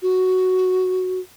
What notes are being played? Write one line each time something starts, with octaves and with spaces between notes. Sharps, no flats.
F#4